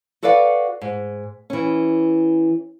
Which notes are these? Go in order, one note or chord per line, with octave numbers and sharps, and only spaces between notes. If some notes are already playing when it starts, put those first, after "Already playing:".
F#4 A4 B4 D5 F5 F#5
G#2
E3 C#4